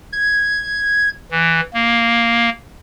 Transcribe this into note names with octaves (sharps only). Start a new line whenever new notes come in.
G#6
E3
A#3